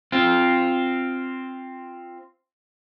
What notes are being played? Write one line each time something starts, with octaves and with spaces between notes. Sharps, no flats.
C4 F4